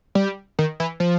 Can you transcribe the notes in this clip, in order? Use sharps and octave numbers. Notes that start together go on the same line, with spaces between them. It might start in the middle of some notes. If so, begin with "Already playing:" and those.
G3
D#3
E3
F3